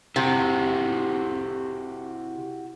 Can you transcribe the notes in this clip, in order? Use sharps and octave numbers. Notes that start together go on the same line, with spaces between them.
C3 E4 F#4 G4